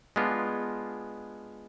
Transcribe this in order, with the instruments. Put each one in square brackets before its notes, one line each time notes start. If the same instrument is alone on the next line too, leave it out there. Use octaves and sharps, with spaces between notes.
[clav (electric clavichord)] G#3 B3 D4 F4